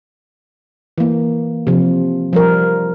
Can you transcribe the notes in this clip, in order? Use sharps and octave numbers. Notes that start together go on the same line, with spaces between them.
E3 A#3
C3 F3
F3 G3 A#4